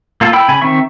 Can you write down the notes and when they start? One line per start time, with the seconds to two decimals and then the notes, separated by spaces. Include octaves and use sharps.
0.21 A#3 F4 A4
0.33 E4 G5 B5 E6
0.48 C#3 G#5 B5
0.62 D#3 C4 E5 C#6